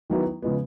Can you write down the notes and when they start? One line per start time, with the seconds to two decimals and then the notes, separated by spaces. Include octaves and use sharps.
0.10 D#3 F#3 B3 E4
0.42 C#3 F3 G#3 B3